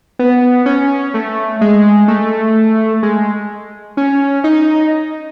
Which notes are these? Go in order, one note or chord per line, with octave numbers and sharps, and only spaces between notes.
B3
C#4
A3
G#3
A3
G#3
C#4
D#4